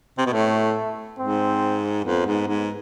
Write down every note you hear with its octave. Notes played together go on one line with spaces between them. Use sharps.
C3
B2
A2 A3
G#2 C4
F2 B3
G#2
G#2